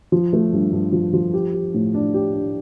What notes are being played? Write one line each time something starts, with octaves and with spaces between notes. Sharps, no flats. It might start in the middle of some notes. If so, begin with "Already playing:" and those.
F3
A3
G2
G2
F3
F3
G4
G4
A2
D4
G4
D4